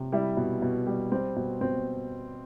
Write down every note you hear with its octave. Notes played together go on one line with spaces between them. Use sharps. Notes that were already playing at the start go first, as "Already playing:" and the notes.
Already playing: C3
G3 E4
B2
B2
G3
G3 C4
B2
B2 C4